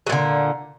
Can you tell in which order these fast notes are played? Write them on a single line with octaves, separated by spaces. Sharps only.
F#3 A#2 D3